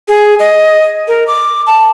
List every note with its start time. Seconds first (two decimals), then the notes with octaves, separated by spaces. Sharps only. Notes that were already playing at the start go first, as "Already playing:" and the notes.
0.08 G#4
0.39 D#5
1.08 A#4
1.27 D6
1.67 A5